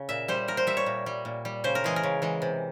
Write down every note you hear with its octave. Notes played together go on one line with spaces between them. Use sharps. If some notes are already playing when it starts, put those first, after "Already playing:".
Already playing: C#3
A#2 E5
G3 C5
A#2 A#4
C5
G3 E5
C#5
A#2
G3
A#2
G3
C#3 C5
A#4
E3 G#3 G#4
A#4
C#3
E3 G#3
C3